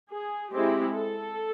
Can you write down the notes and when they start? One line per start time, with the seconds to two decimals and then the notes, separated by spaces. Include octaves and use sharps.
0.11 G#4
0.53 G#3 C4 E4 G4
0.97 A4